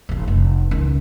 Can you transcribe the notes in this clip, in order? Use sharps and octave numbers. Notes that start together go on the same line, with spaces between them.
G#1 G#2
F1
C#2 D#3